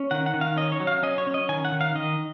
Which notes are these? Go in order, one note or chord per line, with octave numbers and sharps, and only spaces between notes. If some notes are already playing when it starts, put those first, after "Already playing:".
Already playing: C#4
D#3 F#5
F#5
D#3
F5
C#4 D#5
C#5
F#3
F5
C#4 D#5
C#5
C#4
D#5
D#3 G#5
F#5
D#3
F5
D#3 D#5